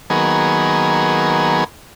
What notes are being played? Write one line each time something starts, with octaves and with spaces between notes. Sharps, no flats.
D#3 F#3 A#3 B3 G#4